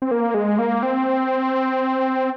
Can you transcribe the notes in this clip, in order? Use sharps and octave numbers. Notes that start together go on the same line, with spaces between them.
C4
A#3
G#3
A#3
C4